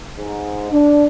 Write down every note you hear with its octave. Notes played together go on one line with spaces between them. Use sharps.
G#2
D4